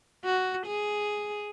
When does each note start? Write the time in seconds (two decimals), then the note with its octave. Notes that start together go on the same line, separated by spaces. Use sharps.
0.25 F#4
0.66 G#4